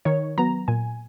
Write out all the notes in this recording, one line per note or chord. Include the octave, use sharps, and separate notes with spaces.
D#3 C#5
F#3 B3 A#5
A#2 G#5